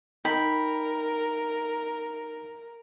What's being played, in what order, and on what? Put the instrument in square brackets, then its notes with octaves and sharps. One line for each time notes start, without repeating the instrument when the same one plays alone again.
[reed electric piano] D#4 G5 [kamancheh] A#4 [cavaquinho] B5